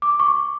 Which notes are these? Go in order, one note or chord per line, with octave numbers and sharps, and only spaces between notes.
D6
C#6